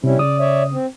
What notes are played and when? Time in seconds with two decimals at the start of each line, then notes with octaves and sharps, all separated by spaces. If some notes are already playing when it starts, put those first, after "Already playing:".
0.04 C3 G3 C#4 E4
0.19 C#3 D5 D#6
0.40 C#5 D5 E5
0.72 C4